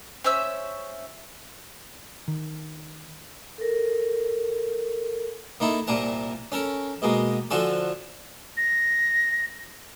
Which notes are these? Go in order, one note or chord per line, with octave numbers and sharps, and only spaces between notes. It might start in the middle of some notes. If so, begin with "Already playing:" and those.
C#4 C5 E5 E6
D#3
A4 A#4
A#3 D#4 E4 A4
C2 A#2 A#3 A#4 A5
C#4 A4 A#4
B2 G#3 A#3
D3 F3 F4 F#4 A4 G#5
A#6